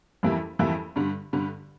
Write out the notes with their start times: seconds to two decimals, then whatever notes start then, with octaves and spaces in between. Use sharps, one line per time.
0.23 F2 E3 G3 A#3 E4
0.59 F2 E3 G3 A#3 E4
0.96 G2 D3 G3
1.33 G2 D3 G3